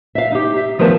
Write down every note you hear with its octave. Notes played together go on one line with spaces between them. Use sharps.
E5 F5
D#4 G4
E5
D#3 F3 A3 B3 A#4 A5